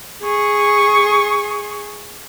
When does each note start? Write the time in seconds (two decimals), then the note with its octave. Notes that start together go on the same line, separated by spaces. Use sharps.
0.22 G#4 C#6